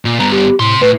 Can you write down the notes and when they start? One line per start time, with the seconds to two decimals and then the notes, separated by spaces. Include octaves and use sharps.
0.05 A#2
0.19 G2 B3 A#5
0.32 G4
0.60 A2 C3 C6
0.81 A2 B4